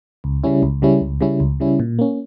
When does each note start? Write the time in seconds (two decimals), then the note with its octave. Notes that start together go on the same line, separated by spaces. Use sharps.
0.24 C#2
0.44 C#3 G3 C#4 E4
0.63 C#2
0.82 C#3 G3 C#4 E4
1.01 C#2
1.21 C#3 G3 C#4 E4
1.40 C#2
1.60 C#3 G3 C#4 E4
1.79 A#2
1.99 A#3 C#4